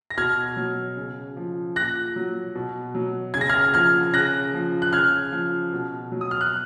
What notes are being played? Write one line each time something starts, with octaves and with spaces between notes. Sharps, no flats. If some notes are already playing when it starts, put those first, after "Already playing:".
A#6
B2 F6 G#6
F#3
C#3
F3
A#2 F#6 A#6
F#3
B2
F#3
C#3 G#6
A#6
F6 G#6
F3 F6 G#6
C#3 F#6 A#6
F3
F#6
C#3 F6 G#6
F3
B2
F#3
D#6
F6
F#6